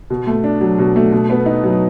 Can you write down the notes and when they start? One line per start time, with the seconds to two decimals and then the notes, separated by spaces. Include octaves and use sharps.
0.10 B2
0.27 A3
0.44 D4
0.61 F#3
0.79 B2
0.96 A3
1.13 B2
1.30 B3
1.46 D#4
1.63 F#3